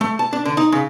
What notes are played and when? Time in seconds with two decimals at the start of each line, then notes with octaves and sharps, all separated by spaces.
0.01 A3
0.19 A5
0.33 D4
0.45 D3
0.57 D#4
0.72 C#3